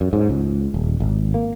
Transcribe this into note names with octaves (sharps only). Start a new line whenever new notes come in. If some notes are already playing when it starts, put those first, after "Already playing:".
F#2
G#2
C#2
D#1
G#1
A#3